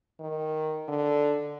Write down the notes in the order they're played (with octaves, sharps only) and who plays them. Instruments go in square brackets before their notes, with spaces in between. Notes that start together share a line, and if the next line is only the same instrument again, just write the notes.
[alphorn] D#3
D3